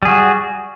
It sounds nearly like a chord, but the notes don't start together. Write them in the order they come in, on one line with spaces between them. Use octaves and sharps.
G3 G#4 F#4